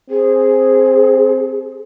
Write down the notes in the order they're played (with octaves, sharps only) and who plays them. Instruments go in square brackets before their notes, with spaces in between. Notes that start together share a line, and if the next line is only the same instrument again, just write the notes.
[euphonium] C4 [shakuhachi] G#4